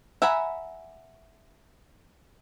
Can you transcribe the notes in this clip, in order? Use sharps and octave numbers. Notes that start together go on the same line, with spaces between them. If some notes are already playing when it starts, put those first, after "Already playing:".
E5 F#5 G#5 A#5 B5